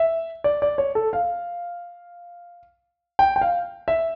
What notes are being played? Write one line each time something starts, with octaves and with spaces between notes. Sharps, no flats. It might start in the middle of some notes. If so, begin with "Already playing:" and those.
Already playing: E5
D5
D5
C#5
A4
F5
G5
G5
F5
E5